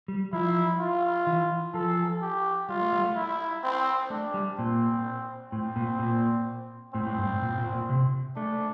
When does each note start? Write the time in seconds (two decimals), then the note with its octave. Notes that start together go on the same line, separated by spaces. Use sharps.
0.08 G3
0.33 F3 E4
0.79 F4
1.27 E3
1.74 F3 A4
2.21 G4
2.69 G3 F4
2.81 A3
2.93 G3
3.05 A3
3.16 E4
3.64 C4
4.10 A3 D4
4.34 G3
4.59 A#2 C4
5.52 A2 C4
5.76 A#2
5.99 A#2
6.94 A2 C4
7.07 A2
7.18 G2
7.30 A2
7.42 A#2
7.58 A#2
7.73 A#2
7.89 C3
8.36 A3 D4